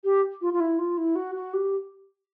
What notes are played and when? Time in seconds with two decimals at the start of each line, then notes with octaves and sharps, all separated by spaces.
0.04 G4
0.41 F4
0.53 F4
0.60 E4
0.79 F4
0.97 E4
1.15 F#4
1.35 F#4
1.53 G4